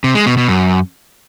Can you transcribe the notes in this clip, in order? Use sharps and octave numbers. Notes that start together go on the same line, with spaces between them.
C3
G#3
B2
B2
F#2